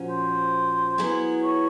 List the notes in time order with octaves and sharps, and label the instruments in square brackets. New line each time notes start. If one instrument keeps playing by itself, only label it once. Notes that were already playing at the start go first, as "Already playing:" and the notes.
Already playing: [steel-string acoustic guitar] A#2 F3 C#4 F#4
[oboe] C5
[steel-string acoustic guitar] F#3 B3 E4 G#4
[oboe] C#5